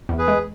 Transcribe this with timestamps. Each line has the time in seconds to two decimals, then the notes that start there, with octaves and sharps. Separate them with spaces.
0.09 E2
0.18 G#4 B4
0.28 G#3